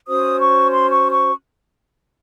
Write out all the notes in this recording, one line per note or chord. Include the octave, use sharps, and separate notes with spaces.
C#4 F#4 C5 D#6
C#6
C6
C#6
C#6